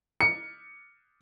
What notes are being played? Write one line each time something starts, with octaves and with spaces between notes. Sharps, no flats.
C#7